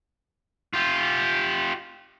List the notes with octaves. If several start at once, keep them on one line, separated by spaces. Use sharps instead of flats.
F4 G4